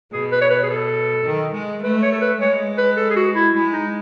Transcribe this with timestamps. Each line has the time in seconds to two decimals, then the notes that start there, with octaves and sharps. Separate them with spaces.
0.12 B2 G#4
0.31 B4
0.41 C#5
0.50 B4
0.63 G#4
0.69 A4
1.26 D#3
1.55 G#3
1.83 A3 B4
2.02 C#5
2.12 A4
2.21 B4
2.40 G#3 C#5
2.78 B4
2.97 A4
3.10 G#4
3.16 F#4
3.35 E4
3.54 G#3 E4
3.72 D#4